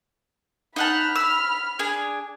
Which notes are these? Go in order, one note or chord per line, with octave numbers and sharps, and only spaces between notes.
D#4 F#5 A5 B5 F6
E6
D4 G#4 G#5